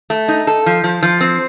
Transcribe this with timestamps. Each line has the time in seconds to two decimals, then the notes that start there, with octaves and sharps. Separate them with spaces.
0.10 A3
0.28 D#4
0.47 A4
0.66 F3
0.84 F3
1.03 F3
1.21 C4